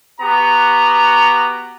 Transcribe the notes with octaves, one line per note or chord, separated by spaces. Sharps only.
B3 F#4 G4 A#5